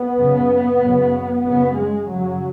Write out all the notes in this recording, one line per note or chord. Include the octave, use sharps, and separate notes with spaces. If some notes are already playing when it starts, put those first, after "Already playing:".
Already playing: B3
F#2 C#3
F#2 C#3
F#2 C#3 B3
G#3
F#2 C#3 F#3